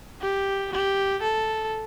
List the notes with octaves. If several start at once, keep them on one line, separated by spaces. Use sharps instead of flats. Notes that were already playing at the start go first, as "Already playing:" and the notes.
G4
G4
A4